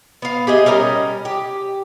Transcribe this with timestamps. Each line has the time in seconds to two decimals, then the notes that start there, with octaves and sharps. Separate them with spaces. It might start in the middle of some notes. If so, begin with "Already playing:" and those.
0.22 B3 F5
0.47 G4 G#4 D#5 E5
0.66 G3 C#4 A#4 D#5
1.25 G4